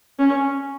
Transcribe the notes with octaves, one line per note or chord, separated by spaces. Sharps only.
C#4